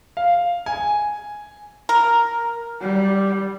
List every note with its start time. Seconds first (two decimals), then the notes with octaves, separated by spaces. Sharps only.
0.17 F5
0.66 G#5
1.89 A#4
2.81 G3